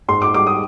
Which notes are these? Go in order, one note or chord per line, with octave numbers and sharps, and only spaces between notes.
G#2 C6
D6
G3 D6
D#6